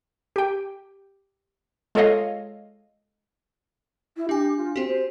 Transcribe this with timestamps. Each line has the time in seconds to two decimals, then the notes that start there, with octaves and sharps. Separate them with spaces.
0.36 G4 G5
1.95 G#3 F4 A4 C#5 D#5 F5
4.17 E4
4.29 D4 G4 G#5
4.57 F4
4.76 C4 F#4 G4
4.88 C5